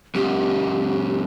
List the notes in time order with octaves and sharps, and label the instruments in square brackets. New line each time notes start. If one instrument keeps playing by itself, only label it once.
[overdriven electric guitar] C#2 F#2 [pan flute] G4